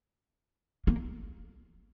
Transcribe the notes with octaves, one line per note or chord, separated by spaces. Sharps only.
A#3